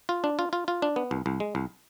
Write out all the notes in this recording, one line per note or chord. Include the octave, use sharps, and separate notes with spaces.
F4
D4
F4
F4
F4
D4
B3
C2
C2
G#3
C2